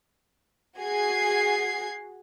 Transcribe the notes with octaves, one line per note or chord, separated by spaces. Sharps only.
F#4 G#4 G#6 C7